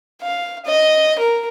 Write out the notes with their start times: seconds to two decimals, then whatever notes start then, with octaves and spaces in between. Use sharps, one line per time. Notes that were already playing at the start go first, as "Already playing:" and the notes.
0.22 F5
0.66 D#5
1.19 A#4